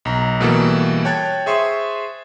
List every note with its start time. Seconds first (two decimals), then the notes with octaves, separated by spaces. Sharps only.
0.05 B1 A#5
0.40 B2 E3 G3 A#3 F#4 A4
1.05 C#5 G5 A5 F#6 G#6 A6
1.46 G#4 C5 E5 C6 C#6 D#6